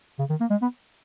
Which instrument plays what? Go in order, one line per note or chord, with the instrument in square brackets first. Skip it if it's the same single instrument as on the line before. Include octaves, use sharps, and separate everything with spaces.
[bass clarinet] C#3
D#3
A#3
G#3
B3